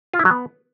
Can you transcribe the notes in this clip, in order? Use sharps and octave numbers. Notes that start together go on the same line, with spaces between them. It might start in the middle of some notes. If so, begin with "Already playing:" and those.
F4
E4
F#3
B3